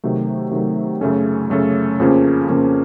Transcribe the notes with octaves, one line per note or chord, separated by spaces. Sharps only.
C3 D#3 F#3 A3
C3 D#3 F#3 A3
F#2 C#3 A3 C#4 A4
F#2 C#3 A3 C#4 A4
F2 C#3 F3 A#3 C#4
F2 C#3 F3 A#3 C#4